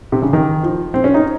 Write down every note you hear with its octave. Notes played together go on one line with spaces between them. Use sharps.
C3
C#3
D#3
F3
C4
C#4
D#4